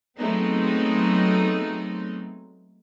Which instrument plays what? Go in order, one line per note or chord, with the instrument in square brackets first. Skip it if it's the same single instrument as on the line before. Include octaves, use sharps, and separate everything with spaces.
[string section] F#3 G#3 A3 B3 C4 D#4